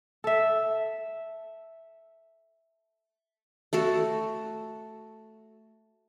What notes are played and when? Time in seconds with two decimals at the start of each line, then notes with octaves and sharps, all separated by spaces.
0.24 A4 E5
3.73 A3 F#4 A4